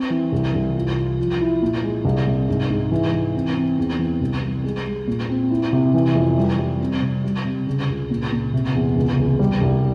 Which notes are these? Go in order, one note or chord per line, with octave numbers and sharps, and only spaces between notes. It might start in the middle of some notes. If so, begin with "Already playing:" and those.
Already playing: C4
E3
C2
C2
F4
F4
F3
E4
A#2
G#3
C2
C3
G#2
G#2
E3
E3
C4
C4
E2
E3
C2
G3
G#3
G#3
A#2
C4
E4
C3
E3
F2
G3
G3
C4
C3
G3
C3
C#3
C#2
A#2
A#2
C3
E2
C#2
C#2
G3
C2